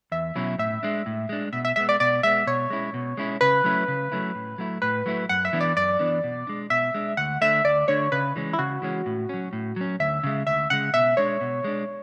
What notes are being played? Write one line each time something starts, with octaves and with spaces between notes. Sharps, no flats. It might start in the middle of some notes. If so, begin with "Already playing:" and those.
E2 E5
B2 F#3 C#4 E4
A2 E5
G#3 D4
A2
G#3 D4
B2 E5
E5
G#3 B3 E5
D5
B2 D5
G#3 B3 E5
B2 C#5
G#3 C#4 E4
B2
G#3 C#4 E4
C#3 B4
F#3 A3 C#4 E4
C#3
F#3 A3 C#4 E4
A2
F#3 A3 E4
A2 B4
F#3 A3 E4
F#2 F#5
E5
E3 B3 D4
D5
F#2 D5
E3 B3 D4
B2
G#3 D4
B2 E5
G#3 D4
D2 F#5
D3 A3 D4 E5
D2 D5
D3 A3 D4 C#5
C#3 B4
E3 G#3 C#4
E4
C#3 F#4
E3 G#3 C#4
A2
F#3 C#4
A2
F#3 C#4
D2 E5
C#3 G#3
D2 E5
C#3 G#3 F#5
B2 E5
G#3 D4 C#5
B2
G#3 D4